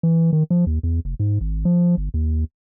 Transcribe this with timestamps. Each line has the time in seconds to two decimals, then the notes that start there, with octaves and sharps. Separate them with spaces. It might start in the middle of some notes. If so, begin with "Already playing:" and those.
0.03 E3
0.33 D#3
0.50 F3
0.67 D#2
0.83 E2
1.05 F1
1.20 G#2
1.41 G#1
1.65 F3
1.97 G1
2.14 D#2